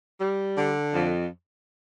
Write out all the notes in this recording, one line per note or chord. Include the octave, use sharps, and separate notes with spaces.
G3
D3
F2